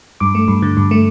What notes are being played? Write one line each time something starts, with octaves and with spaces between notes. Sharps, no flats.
G2 D6
A3
G2
D3
G2
A3